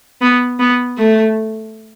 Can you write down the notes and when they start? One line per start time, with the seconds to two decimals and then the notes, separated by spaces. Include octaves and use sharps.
0.21 B3
0.59 B3
0.98 A3